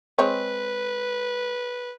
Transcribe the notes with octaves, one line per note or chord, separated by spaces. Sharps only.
G#3 C4 B4 C#5